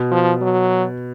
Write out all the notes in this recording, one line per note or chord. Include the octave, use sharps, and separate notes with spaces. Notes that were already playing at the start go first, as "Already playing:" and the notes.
Already playing: B2
F3
F#3